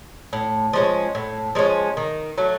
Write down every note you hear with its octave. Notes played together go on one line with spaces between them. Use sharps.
A2
F3 G#3 C#4
A2
F3 G#3 C#4
D#3
F#3 A3